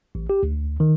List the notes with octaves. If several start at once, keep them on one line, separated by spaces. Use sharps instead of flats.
A1
G4
D2
D#3